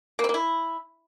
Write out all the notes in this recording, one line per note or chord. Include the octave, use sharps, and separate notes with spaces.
A#3
C4
A#3
E4